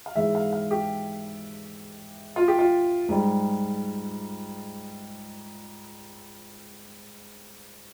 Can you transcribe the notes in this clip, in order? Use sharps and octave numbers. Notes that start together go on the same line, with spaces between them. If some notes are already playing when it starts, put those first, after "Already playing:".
F5
G#2 E3 G#3 E5
F5
F5
G4
F4
G4
F4
G#2 G3